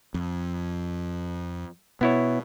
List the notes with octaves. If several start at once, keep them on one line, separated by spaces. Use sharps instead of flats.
F2
B2 B3 E4 C#5